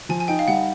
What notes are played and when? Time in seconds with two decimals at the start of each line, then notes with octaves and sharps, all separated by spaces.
0.09 F3 G#5
0.20 G#5
0.28 D#4 G5
0.39 F5
0.48 G3 F#5